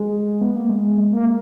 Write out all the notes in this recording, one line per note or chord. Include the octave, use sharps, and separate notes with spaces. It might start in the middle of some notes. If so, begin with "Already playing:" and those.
Already playing: G#3
B3
A#3
G#3
A#3